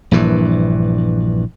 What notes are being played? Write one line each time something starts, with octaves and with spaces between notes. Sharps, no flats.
A#1 G2 E3